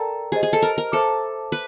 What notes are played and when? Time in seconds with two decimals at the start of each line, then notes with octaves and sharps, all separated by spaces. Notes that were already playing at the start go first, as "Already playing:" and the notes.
Already playing: A4 A#4 D5 G5 A#5
0.32 G4 G#4 C5 D#5
0.43 G#4
0.53 A4
0.62 A#4
0.78 A#4
0.92 A4 C5 E5 A5 D6
1.52 B4